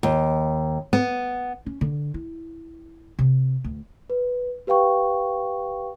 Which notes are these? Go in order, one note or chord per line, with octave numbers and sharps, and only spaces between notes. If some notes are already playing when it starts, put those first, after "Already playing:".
D#2
B3
C#4
D3
E4
C3
D2
B4
G4 B4 F5 G5 C#6